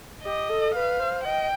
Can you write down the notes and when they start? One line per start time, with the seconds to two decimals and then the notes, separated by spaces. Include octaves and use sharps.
0.24 G4 D#5
0.49 A4
0.74 B4 F5
0.99 C5
1.24 D#5 G5